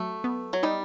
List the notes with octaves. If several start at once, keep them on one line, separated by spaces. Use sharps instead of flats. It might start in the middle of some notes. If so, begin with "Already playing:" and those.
Already playing: F#3 A3
B3
F#3
G3 D#4